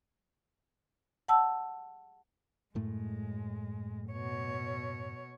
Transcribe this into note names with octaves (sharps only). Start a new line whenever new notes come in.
F#5 A5 E6
F#2 A2 G#3 A3
B2 C#5